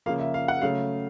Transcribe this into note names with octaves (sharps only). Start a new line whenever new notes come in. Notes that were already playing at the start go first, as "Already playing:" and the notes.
C#3 F3 A#3 F5
E5
F5
F#5
C#3 F#3 A3 F5